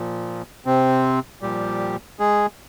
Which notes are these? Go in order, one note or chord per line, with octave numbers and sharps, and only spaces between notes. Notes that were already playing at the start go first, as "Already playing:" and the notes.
Already playing: A#2 F3
C3 C4
A#2 F3 G3 G4
G#3 G#4